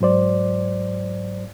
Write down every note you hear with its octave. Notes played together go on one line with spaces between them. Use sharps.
G#2 F#3 C5 D5